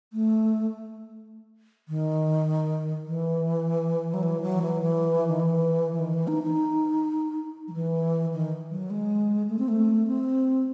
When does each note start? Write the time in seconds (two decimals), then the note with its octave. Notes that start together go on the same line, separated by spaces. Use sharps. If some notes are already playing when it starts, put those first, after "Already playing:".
0.13 A3
1.89 D#3
3.05 E3
4.14 F#3
4.23 E3
4.42 F#3
4.62 E3
4.81 E3
5.27 D#3
5.40 E3
5.93 E3
5.99 D#3
6.14 E3
6.28 D#4
6.43 D#4
7.68 F#3
7.73 E3
8.33 D#3
8.71 F#3
8.90 G#3
9.49 A3
9.59 C4
9.68 A3
10.07 C4